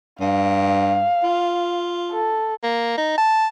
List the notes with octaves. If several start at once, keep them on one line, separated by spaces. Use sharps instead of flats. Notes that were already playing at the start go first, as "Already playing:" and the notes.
G2 F5
F4
A4
A#3
D#4
A5